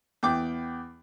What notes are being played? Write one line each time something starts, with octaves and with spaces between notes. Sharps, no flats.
E2 G5 D6